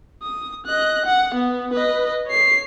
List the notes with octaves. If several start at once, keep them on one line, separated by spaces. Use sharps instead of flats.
D#6
D#5 F#6
F#5
B3
B4 D#5
C#5 C7